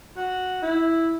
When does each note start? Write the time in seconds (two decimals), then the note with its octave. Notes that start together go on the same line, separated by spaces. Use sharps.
0.17 F#4
0.62 E4